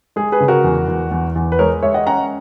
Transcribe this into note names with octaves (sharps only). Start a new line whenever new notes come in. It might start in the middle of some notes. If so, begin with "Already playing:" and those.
G#3 G#4
G#4 B4
C#3
F#4 A#4
E2
E2
E2
E2
B4
G#3 A#4 C#5
G#3 C#5 E5
D#5 F#5
C#4 F#5 A#5